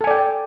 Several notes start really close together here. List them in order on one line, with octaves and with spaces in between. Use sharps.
A4 G#5 D5 G5